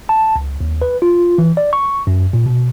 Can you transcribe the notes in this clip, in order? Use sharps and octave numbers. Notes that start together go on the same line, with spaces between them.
A5
C#2
D#2
B4
F4
E3
D5
C#6
F#2
A#2
B2